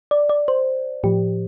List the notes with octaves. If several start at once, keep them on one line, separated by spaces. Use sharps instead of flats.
D5
D5
C5
A2 F3 G4